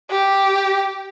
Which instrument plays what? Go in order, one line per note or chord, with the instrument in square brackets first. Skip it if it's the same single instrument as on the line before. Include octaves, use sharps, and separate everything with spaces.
[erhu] G4